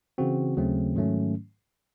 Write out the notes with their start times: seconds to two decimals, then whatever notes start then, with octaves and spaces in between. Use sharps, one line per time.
0.18 C#3 E3 C4 F#4
0.57 D#2 C#3 F#3 A3 C4
0.95 G#2 D#3 F#3 A3 C#4